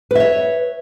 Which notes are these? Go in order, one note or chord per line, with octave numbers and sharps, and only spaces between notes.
B4 C#5 E5